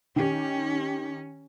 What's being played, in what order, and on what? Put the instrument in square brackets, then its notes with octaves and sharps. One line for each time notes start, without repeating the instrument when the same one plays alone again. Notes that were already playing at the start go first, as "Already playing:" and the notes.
[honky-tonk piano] D#3 G4 [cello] C#4